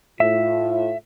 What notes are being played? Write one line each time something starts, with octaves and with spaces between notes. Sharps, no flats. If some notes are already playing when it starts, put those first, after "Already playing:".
A2 F4 E5